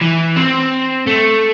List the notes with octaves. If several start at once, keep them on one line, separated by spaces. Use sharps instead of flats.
E3
C4
A3